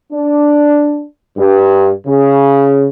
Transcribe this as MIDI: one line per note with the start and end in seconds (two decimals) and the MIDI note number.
0.12 1.04 62
1.37 1.89 43
2.07 2.86 49